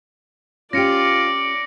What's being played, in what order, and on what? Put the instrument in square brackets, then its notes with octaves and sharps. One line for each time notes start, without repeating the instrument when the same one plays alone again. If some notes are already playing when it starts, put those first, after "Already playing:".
[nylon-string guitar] C#4 G4 [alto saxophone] F4 [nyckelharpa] D5 [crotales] A#6 C#7 D7